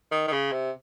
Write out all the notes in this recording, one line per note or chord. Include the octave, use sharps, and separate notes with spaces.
D#3
D#3
C#3
C3